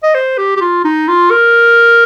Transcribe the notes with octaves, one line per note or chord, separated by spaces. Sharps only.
D#5
C5
G4
G4
F4
D#4
F4
A#4